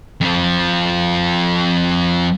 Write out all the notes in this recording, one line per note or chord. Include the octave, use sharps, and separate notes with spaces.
F2 F3